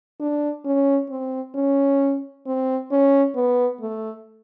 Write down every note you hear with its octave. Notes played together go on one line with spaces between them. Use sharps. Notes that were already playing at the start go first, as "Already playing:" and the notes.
D4
C#4
C4
C#4
C4
C#4
B3
A3